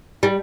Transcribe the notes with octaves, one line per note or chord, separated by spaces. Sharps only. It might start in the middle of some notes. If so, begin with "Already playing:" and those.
G3